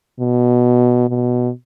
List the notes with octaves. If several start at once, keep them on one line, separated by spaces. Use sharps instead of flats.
B2
B2